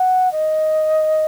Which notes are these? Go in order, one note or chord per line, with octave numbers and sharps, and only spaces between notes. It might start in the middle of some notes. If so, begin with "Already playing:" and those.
Already playing: F#5
D#5